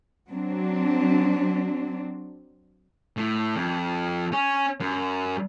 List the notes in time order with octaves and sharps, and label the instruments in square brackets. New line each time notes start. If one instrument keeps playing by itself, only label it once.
[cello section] F#3 C4 D4
[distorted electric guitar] A2
F2
C#4
F#2